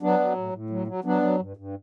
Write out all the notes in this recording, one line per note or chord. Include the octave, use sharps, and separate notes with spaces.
F#3 B3 D4
F#3
A2
A2
F#3
F#3
F#3 B3 D4
F#3
G2
G2